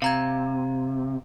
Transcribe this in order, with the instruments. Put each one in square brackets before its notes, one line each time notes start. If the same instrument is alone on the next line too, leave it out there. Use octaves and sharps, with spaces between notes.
[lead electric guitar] C3 [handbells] F5 A#5 G#6